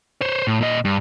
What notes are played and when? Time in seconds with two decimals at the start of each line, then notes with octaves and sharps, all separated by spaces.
0.21 C5 C#5
0.47 A2
0.61 A#2 D#5
0.85 G2